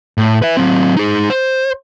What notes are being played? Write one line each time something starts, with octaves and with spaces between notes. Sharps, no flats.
A2
B4 E5
F#3 C4
D#4 G#4
C5